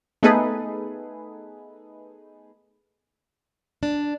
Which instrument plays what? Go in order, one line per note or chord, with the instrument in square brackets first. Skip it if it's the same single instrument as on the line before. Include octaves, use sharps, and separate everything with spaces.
[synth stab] A3 B3 D#4 G#4 A4 B4
[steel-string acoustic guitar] D4